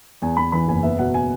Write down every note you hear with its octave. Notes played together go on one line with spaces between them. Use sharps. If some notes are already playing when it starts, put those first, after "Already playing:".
E2 G#5
E2 B5
E3 B5
F#1 G#5
B3 E5
B2 F#5
G#5